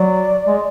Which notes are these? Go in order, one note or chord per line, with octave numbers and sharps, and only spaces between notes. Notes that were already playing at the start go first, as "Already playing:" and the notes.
Already playing: F#3 D5
G#3